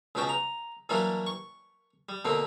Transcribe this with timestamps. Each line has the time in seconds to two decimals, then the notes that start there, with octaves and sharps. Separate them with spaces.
0.15 C#2 B2 C#4 F#4 G5 A5
0.29 A#5
0.89 E3 F#3 G3 A#3 D4 E4
1.26 C#6
2.09 G3
2.25 B2 D3 A#3 C4